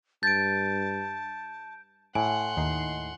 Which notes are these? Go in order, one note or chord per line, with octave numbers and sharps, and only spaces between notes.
G2 A5 G6 A6 D7
A2 F#5 G#5 C6
D#2 D#4 C7